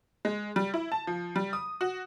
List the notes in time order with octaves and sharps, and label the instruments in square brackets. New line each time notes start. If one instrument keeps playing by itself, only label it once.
[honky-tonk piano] G#3
G3
E4
A5
F3
G3
D#6
F#4